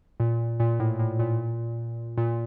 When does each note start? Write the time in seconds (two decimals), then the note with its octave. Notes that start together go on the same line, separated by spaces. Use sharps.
0.20 A#2
0.60 A#2
0.80 A2
0.99 A2
1.19 A#2
2.17 A#2